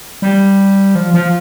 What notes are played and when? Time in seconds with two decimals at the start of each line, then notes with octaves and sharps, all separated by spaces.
0.22 G3
0.95 F3
1.14 F3